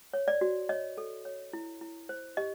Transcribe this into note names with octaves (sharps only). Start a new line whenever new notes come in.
C#5
D5
F#4
C#5 D#5
A4
C#5
E4
E4
C5
G4 D#5